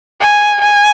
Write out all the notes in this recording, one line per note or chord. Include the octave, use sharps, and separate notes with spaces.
G#5
G#5